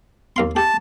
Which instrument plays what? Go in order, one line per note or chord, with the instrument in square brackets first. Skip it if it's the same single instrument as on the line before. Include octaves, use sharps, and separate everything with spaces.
[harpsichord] D#2 F5 C6
[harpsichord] G4 [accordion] A5